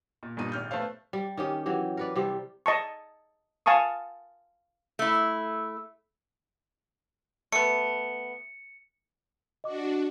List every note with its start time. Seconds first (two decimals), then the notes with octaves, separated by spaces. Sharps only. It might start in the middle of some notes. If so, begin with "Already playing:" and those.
0.23 A#2
0.37 G1 G2 A#2 D#4 D#7
0.52 G#1 F6 G6
0.71 A3 B3 C5 F5
1.13 G3
1.37 D#3 C#4 G4
1.66 E3 F#3 G4
1.97 A#4 B4 D5
2.16 C3 G3 G4
2.66 D#5 A5 C#6
3.66 F5 G#5 A5 C#6 D#6
4.99 A3 E4
7.52 A3 B3 C#7
9.64 D4 F#4 D#5 D6